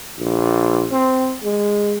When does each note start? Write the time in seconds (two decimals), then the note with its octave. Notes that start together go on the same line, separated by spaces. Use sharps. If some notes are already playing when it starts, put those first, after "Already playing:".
0.18 A#1
0.91 C4
1.44 G#3